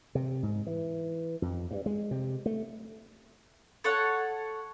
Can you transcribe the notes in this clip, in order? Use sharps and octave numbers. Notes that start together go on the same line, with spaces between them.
C3
G#2
E3
F2
G2
G#3
C3
A3
A4 C#5 F#5